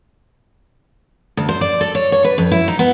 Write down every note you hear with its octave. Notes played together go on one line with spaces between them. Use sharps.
D2
C5
D5
A4
C#5
C#5
B4
F2
E4
D#4
B3